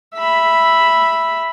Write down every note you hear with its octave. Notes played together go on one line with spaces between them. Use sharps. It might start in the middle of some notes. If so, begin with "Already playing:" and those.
E5 B5